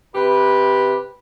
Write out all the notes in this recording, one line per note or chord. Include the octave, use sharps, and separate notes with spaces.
C3 G4 B4